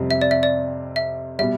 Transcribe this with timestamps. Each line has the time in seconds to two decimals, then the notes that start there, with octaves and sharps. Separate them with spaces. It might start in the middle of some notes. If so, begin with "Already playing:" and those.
Already playing: F2 C3 G3
0.11 E5
0.21 D5
0.31 E5
0.43 D5
0.96 E5
1.39 B2 G3 E5